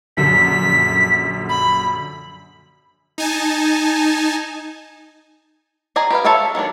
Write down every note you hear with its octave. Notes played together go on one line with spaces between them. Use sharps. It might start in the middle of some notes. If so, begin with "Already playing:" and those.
A#1 F#2 D3 B6
B5
D#4 G#5 A5
G#4 D5 D#5 G#5 A#5
G4 B4 F5
A4 C#5 E5 F5 G5
D#3 F#3 G#3 D4